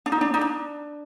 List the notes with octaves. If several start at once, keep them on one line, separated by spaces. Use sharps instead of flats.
D4
D#4
D4
D#4
D4